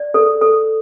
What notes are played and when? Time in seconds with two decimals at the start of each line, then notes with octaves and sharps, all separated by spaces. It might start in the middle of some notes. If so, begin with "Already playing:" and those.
Already playing: D5
0.14 A4
0.41 A4